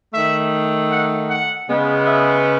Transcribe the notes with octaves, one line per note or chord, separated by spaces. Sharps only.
D#3 A3 E5
F#5
F#5
C#3 G#3 B3
E5